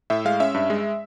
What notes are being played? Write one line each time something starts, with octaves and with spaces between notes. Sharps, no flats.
A2 E5
G#3 F5
C#4 E5
G2
G#3